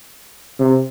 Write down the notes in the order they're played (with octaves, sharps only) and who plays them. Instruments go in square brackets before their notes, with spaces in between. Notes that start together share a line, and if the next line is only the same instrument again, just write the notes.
[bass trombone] C3